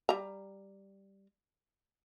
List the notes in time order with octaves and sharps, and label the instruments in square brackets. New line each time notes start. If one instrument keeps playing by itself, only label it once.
[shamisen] G3 A#5